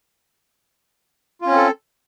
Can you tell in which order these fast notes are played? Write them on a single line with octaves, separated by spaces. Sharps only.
F4 C#4 C4 A4